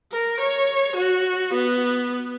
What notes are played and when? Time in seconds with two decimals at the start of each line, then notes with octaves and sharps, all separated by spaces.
0.12 A#4
0.40 C#5
0.96 F#4
1.53 B3